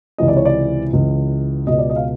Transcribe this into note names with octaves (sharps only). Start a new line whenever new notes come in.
C#2 C3 E3 D#5
D5
C#5
D5
C#2 C#3 E3
C#2 B2 D#5
D5
D#5
F5